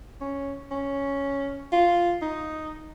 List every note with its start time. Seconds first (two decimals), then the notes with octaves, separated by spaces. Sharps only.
0.21 C#4
0.71 C#4
1.72 F4
2.22 D#4